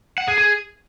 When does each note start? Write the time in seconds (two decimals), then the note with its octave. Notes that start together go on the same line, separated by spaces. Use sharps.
0.18 F#5
0.28 G#4
0.38 G#4